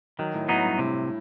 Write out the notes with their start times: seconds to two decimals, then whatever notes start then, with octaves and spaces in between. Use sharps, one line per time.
0.19 D#3 F#3
0.34 A2
0.49 A2 F#3 B3 D#4
0.64 G2
0.79 A2 C3